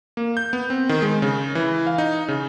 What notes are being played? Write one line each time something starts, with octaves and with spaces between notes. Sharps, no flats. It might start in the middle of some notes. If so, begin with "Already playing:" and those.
A#3
G6
B3
C4
D#3
G#3
C#3
E3
F5
D#4
C#3